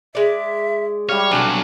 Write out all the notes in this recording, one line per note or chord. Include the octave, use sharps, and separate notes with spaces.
G#3 D5 E5
G3 G4 C#5 F5
B1 C3 F#3 A3 D4 F#4 G#5